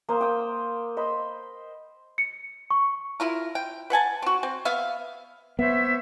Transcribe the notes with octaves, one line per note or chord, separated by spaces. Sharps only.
A#3 C5 D#6
G5 D#6
C5 D#5 B5
C#7
C#6
E4 F4 A#4
G5
B4 F#5 G#5 A5
C4 F#4
C4
B3 E5 F5
B3 C5 C#5 E5